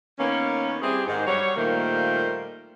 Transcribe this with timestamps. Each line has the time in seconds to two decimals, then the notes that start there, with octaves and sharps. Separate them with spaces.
0.19 D#3 A#3 B3 C#4
0.82 G3 C4 E4 G4 G#4
1.07 G#2 D#3 C5
1.27 F#3 G3 G4 C#5
1.56 A#2 D#3 G3 A3 A#3 C5